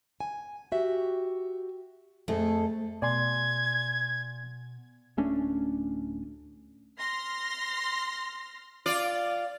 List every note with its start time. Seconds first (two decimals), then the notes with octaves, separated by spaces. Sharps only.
0.20 G#5
0.72 F#4 G4 E5
2.28 F2 A3 G#4 A4
3.02 B2 D5 G#5 C6 G#6
5.17 D1 A3 C#4 D4
7.00 C6 F6 A#6
8.86 F4 D5